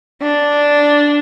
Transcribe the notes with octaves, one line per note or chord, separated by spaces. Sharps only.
D4